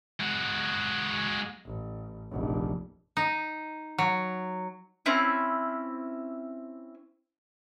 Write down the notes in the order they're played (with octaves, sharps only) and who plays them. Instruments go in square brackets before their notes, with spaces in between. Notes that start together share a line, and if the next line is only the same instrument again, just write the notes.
[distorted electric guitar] G#3 F#4
[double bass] A1
F1 A#1
[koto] D#4
F#3
[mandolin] C4 C#4 E4